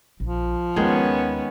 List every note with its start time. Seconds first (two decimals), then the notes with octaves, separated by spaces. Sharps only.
0.20 A#1 F3
0.76 D#2 D#3 G#3 B3 C#4